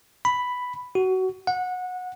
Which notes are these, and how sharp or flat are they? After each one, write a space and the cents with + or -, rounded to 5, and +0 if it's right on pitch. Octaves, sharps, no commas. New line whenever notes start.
B5 +5
F#4 +20
F#5 -20